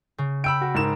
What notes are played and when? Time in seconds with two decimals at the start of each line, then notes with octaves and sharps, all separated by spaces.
0.18 C#3
0.44 G5 B5 E6 D7
0.61 F#4
0.74 G#2 A#4 E7